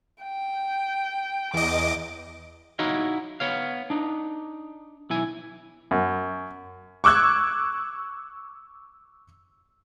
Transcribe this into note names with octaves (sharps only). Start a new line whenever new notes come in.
G5
E2 D#5 D6
D#4 E4 F#4 C#5 D#5 F5
B3 C#5 F5
D4 D#4
B1 E4 G#5
F#2
C#6 D6 E6 F#6 G#6